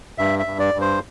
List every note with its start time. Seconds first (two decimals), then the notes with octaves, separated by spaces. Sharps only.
0.18 G2 E5
0.39 E5
0.46 G2
0.59 D5
0.74 G2
0.81 C5